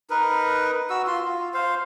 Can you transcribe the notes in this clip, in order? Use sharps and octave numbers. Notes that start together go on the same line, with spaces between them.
D#4 A#4 B4
F#4 E6
F4 C6
F4
C5 F5